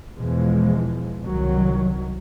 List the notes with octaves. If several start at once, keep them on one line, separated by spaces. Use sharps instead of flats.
E2 B2 E3 F3 G#3
C2 D#3 F#3